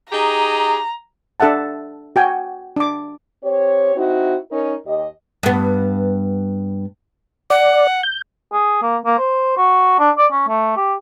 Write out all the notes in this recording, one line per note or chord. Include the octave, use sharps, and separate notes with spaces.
D#4 G4 G#4 A#5
D4 A4 E5 F#5 A5
F#4 G5 G#5
D4 D6
C4 G4 C#5
C4 D#4 E4 F#4
C#4 D#4 A#4
D#2 G4 D#5
G2 B3
D5 F#5
G6
G#4
A#3
A#3
C5
F#4
D4
D5
C#4
A3
G4